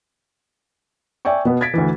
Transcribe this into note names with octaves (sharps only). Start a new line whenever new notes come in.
D5 E5 G5 G#5 C#6
B2 B3
G#6 A6 B6 D7
D2 E3